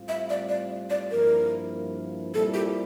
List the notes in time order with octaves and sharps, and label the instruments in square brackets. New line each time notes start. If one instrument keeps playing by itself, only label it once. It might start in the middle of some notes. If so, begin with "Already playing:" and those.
Already playing: [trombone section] A2 G3 C4 F4
[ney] E5
D5
D5
D5
[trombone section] G2 F3 A#3 E4 [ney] A#4
[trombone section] A#2 G3 C4 E4 [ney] A4
[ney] G4